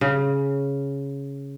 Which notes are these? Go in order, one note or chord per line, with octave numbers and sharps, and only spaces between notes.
C#3